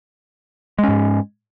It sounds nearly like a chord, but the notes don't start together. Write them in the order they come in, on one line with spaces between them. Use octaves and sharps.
G#3 C#4 G#2